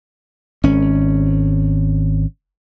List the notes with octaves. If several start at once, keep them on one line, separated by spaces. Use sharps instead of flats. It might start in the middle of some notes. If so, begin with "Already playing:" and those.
G#1 C#4